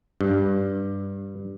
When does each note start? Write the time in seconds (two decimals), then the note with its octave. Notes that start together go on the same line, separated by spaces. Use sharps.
0.21 G2